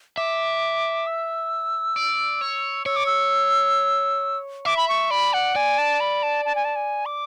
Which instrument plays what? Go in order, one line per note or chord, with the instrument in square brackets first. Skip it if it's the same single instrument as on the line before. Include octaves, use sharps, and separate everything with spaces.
[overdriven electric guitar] E5 [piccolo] D6
[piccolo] E6
[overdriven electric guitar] D5
C#5
[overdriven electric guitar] C#5 [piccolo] E6
[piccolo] D6
E6
[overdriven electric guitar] E5 [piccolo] D6
[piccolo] B5
C#6
[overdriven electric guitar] D5 [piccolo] B5
[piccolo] F#5
[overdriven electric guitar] D5 [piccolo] G#5
[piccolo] A5
B5
A5
A5
G#5
A5
G#5
D6